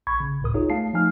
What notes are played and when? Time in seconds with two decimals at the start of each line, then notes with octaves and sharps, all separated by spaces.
0.07 A#1 B5 C#6 G#6
0.20 C#3
0.41 G1 C#2 A2 A#4 D#6
0.54 D#4 F4 G#4 C#5
0.70 A3 F5 A5 C7
0.93 F3 A3 D#4 G#5 F6